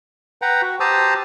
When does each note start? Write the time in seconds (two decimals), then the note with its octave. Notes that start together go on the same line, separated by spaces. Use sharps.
0.42 B4 F#5 G5 A#5
0.62 F#4
0.80 G4 C5 A5 A#5 D#6 E6